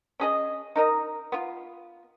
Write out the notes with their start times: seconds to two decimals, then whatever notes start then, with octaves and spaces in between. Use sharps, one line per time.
0.20 C#4 G#4 D#5
0.75 D#4 A#4 D#5
1.32 B3 F4